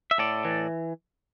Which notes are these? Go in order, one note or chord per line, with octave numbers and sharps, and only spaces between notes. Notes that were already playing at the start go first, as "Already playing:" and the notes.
E5
A2 A4 D5
E3